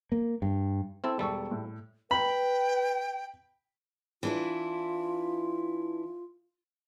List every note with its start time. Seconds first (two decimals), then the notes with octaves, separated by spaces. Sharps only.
0.12 A#3
0.42 G2
1.04 C4 E4 A4
1.19 E1 G3 A4 C#6
1.51 A2
2.11 B4 G5 B5
4.23 E3 D4 E4 F4